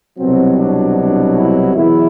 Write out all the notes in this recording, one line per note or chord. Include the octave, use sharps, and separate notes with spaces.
C2 B2 F#3 C4
D4
D4
E4
E2 B2 F#3 E4